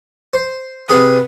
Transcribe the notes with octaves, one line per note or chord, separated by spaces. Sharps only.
C5
C3 G#4 B4 D#6